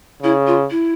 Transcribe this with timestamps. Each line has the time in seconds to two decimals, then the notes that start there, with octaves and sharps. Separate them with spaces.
0.23 C#3 E4
0.46 F4
0.70 E4